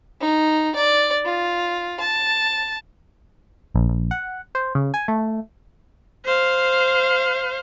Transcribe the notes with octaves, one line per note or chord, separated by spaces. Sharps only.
D#4
D5
F4
A5
A#1
A#1
F#5
C5
C#3
G#5
A3
C5 F5